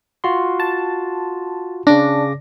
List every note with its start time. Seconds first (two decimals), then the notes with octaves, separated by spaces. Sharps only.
0.24 F4 F#4 C6
0.60 A5
1.87 C#3 D4 D6 A#6